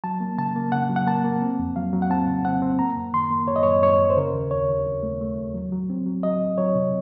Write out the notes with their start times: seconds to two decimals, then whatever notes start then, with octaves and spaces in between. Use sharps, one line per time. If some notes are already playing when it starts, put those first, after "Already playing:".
0.04 F#3 A5
0.20 A#3
0.38 C#3 A5
0.56 A#3
0.72 C#3 F#5
0.89 F#3
0.96 F#5
1.07 A#3 A5
1.24 A#3
1.42 C4
1.59 F2
1.76 F#3 F5
1.93 F#3
2.02 F#5
2.10 C4 A5
2.28 C#3
2.45 C4 F#5
2.62 C4
2.79 A#3 A#5
2.96 F#2
3.13 D#3 C6
3.30 A#3
3.48 F#2 C#5
3.56 D#5
3.63 C#5
3.66 F#2
3.83 F#2 C#5
4.00 F#2
4.10 C5
4.17 C#3 A#4
4.34 D#2
4.51 D#2 C#5
4.69 D#2
4.86 D#2
5.03 A3
5.21 A3
5.38 D#2
5.54 F#3
5.72 F#3
5.90 C4
6.06 F#3
6.23 F#3 D#5
6.41 C2
6.58 F#3 C#5
6.75 C3